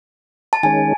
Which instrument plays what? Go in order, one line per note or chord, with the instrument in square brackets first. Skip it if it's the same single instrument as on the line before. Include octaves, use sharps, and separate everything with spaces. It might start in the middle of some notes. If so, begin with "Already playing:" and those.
[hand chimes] A5
[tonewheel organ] D#3 G#3 C#4 [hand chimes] G#5